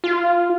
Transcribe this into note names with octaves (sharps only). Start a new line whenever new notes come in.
F4